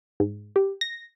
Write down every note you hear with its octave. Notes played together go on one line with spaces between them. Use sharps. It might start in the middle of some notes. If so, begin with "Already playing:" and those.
G#2
G4
A#6